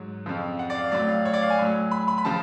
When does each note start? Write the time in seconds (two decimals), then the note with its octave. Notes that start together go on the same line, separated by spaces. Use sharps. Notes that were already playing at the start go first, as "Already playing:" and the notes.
Already playing: G#2 F#3
0.26 F2 C#3 F3
0.59 F#5
0.70 D5
0.75 F5
0.92 A2 F#3 D5
1.09 F5
1.25 C#5
1.33 D5
1.42 F5
1.50 G#5
1.59 A2 F#3
1.91 B5
2.08 B5
2.18 B5
2.25 C#3 F3 A5